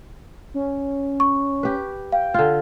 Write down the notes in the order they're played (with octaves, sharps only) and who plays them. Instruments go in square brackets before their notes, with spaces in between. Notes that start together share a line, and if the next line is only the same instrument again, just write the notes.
[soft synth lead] C#4
[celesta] C#6
[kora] G4 B4
[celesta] F5 [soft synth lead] G5
[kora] D3 F4